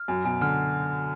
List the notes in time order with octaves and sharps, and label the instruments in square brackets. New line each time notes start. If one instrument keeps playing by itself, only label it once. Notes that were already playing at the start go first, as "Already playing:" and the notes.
Already playing: [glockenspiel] F6
[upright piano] F#2 [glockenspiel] G#5
[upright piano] B2 [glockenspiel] G#5
[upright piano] D3 [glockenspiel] F6